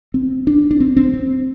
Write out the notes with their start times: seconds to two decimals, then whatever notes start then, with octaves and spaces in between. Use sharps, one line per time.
0.14 C4
0.47 D4
0.71 D4
0.80 C4
0.97 C4
1.14 C4